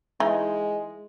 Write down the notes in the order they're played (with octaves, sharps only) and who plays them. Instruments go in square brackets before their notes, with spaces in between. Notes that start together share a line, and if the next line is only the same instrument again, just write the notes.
[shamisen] E3 D#4 [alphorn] G#3